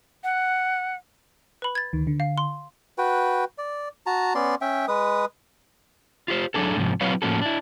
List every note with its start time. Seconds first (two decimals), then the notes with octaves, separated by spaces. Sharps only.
0.24 F#5
1.62 B4 B5
1.75 G#6 A6
1.93 D2 D#3
2.07 D3
2.20 F5
2.38 C6
2.98 F#4 B4 G5
3.58 D5
4.06 F#4 A5 A#5
4.35 B3 C#4 D5 C6
4.61 C#4 E5 G5
4.88 G#3 B4 D#6
6.28 F4 G4 C5
6.54 F#3 A3 D4 G#4 A4
6.76 G#2 C3 F3
7.01 F#3 C4 E4 B4 C#5 F5
7.22 A2 F3 A#3 C#4 F#4 A4
7.42 D4 E4